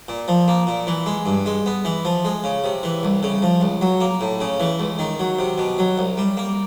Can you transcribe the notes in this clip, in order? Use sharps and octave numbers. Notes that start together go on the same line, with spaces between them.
A#2
F3
A#3
A#2
E3
G#3
G2
G#3
B3
E3
F3
G#3
C#3
C3
E3
C2
C#3
F3
C#2
F#3
A#3
A2
C#3
E3
C#2
D#3
F#3
C3
B2
F#3
C2
G3
A#3